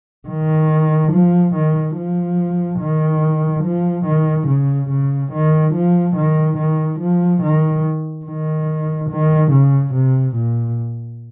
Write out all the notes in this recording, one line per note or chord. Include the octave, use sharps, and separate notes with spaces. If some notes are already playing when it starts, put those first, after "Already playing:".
D#3
F3
D#3
F3
D#3
F3
D#3
C#3
C#3
D#3
F3
D#3
D#3
F3
D#3
D#3
D#3
C#3
C3
A#2